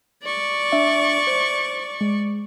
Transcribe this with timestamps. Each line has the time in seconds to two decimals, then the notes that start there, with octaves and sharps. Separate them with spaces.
0.23 D5 C#6
0.72 D4 E5
1.27 C5
2.01 G#3